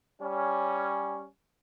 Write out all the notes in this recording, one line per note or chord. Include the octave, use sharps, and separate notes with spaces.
G3 C#4